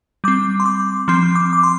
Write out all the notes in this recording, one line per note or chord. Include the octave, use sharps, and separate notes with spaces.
G3 C4 D6
C6
D6
F3 C4 C6
D6
D6
C6